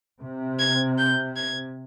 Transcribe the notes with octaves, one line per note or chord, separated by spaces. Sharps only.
C3
G#6
G6
G#6